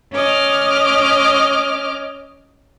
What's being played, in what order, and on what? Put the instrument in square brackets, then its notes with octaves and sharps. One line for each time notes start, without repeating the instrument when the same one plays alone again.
[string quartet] C#4 D#5 D6 F6